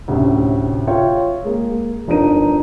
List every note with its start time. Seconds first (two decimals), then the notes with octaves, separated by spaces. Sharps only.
0.08 D2 A2 C3 C#4
0.87 F4 C#5 E5 G5
1.44 G#3 A#3
2.08 G1 F2 D4 D#4 A#4 D#7